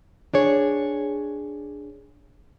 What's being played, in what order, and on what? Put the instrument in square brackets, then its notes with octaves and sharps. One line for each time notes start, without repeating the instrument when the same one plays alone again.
[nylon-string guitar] D4 G#4 C#5